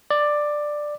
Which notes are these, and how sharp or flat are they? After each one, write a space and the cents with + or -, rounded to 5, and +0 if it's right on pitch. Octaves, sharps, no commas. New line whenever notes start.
D5 +10